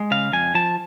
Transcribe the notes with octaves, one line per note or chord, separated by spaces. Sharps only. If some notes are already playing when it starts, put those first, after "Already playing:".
Already playing: G#3
C#3 F5
F2 G#5
F3 A5